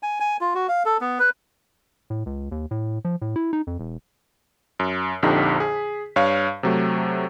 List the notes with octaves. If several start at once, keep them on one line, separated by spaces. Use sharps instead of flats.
G#5
G#5
F4
F#4
F5
A4
B3
B4
A2
C#2
D#2
A2
F3
A2
E4
D#4
F2
E1
F#2
A#1 F2 D3 D#4 G4 B6
G#4
G2 C#5 F5
C3 F#3 A3